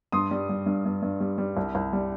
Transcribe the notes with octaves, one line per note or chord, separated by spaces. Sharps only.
G2 C6 D#6
G3
G3
G2
G2
G2
G3
G3
C2
C2
G3